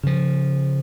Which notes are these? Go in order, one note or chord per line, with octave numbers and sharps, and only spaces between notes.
C#3 F3